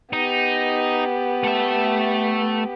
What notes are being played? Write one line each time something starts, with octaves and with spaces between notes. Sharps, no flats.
B3 D#4 G4
A3 E5